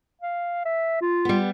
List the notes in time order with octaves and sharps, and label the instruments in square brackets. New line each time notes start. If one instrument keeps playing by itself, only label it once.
[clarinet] F5
E5
F4
[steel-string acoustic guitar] G3 B3